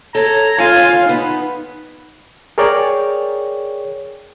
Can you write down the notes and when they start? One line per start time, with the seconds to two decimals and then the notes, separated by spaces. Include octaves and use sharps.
0.15 A4 C#5 A#5
0.58 F4 F5 G#5
1.09 B3 D#4 B4
2.58 G#4 A#4 C#5 D5 G5